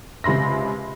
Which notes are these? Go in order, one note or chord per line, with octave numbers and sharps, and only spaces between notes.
C#2 C3 B5 C6 A#6